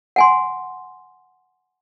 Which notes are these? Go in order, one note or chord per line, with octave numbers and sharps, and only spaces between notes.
F#5 G#5 C6